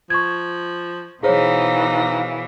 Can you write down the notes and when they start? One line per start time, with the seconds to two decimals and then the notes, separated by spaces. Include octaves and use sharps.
0.10 F3 C#6 G#6
1.23 B2 E3 D#4 G#4 C5 C#5 F5